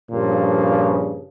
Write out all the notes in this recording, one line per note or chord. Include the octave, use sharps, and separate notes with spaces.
G2 A#2 C#3 F3